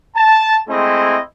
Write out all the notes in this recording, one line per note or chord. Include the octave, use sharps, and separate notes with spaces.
A5
G#3 A3 C4 E4 G#4 D#5